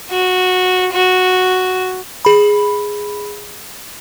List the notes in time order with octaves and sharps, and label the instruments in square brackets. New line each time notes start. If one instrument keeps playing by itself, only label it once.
[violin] F#4
F#4
[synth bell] G#4 B5